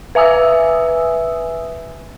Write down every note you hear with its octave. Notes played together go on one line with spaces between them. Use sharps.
B4 E5 G#5 D#6 E6